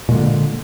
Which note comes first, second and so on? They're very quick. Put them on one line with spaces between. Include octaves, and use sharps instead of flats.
A#2 G#3 D3 A#3